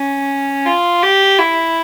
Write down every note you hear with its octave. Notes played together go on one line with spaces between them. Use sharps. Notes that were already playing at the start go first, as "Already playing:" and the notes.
Already playing: C#4
F4
G4
E4